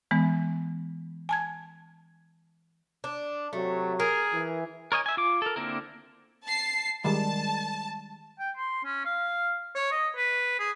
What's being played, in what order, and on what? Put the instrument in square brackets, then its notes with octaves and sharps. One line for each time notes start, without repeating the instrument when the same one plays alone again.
[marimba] E3 G#3 B3
G#5 A5 G#6
[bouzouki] D4
[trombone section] C3 F#3 [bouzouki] A3
[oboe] G#4 [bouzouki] A#4
[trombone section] E3
[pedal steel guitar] A#4 C#5 D#5 G#5
E5 G#5
F4 D6
A4 A#4
D3 A#3 C4 E4 A#4
[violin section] A5 C7
[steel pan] D#3 G3 G#3 [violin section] A5
[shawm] G5
C6
C#4
F5
C#5
D#5
B4
G#4